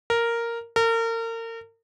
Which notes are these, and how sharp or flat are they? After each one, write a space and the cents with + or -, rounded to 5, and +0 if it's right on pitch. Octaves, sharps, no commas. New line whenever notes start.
A#4 -5
A#4 -35